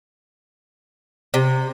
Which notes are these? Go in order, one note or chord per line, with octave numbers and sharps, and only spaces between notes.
C3